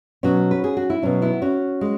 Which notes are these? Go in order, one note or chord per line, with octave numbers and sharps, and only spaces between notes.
B2 F#3 C#4 F#4
B4
G#4
F#4
E4
B2 F#3 C#4
B3 E4
C#4 F#4
G#3